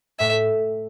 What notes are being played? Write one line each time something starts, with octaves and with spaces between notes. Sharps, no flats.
A2 E5